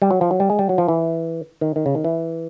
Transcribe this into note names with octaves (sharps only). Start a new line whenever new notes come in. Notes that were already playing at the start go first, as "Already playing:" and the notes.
G3
F#3
F3
F#3
G3
G#3
G3
F#3
F3
E3
D#3
D#3
C#3
D#3
E3